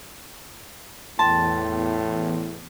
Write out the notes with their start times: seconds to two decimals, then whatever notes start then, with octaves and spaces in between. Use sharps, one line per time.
1.19 E2 A2 G5 A5 C6